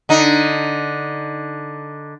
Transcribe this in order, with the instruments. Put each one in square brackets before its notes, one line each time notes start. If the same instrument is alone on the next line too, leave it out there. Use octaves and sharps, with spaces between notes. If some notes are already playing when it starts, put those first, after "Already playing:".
[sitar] D3 D#4